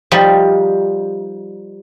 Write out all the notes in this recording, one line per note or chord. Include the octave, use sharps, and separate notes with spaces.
F3 G3 D#4